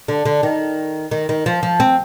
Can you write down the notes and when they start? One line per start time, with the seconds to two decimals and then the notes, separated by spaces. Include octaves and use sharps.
0.08 D3
0.25 D3
0.43 D#3
1.11 D#3
1.29 D#3
1.46 F3
1.63 F3
1.80 C4